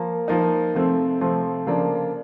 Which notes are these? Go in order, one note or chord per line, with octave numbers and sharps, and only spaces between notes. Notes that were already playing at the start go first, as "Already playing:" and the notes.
Already playing: F3 A#3
F3 A#3 D#4
C3 F3 A3 C4
C3 F3 A3 C4
C#3 F3 A#3 D4